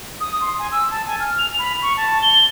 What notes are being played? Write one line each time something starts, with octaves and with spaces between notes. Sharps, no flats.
D#6
C6
G#5
E6
A5
G#5
F6
F7
B5
C#6
A5
G7